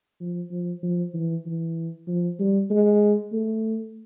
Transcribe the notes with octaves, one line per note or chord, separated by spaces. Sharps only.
F3
F3
F3
E3
E3
F3
G3
G#3
A3